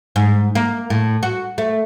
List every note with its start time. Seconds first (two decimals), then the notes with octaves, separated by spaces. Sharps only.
0.16 G#2
0.55 A#3
0.90 A2
1.23 F#4
1.58 A3